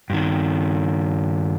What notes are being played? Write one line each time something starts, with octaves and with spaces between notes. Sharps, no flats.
G2 D#3